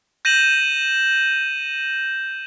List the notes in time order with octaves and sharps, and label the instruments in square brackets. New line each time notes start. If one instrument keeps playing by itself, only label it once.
[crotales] G6 A#6 D#7 E7 F#7